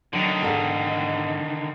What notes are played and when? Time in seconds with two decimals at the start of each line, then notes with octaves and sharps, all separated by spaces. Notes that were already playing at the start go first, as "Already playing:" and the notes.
0.13 D3 D#3 F#3
0.43 G#2 A4